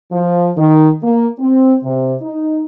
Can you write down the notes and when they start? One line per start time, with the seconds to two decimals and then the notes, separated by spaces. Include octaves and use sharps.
0.11 F3
0.57 D#3
1.03 A#3
1.39 C4
1.83 C3
2.21 D#4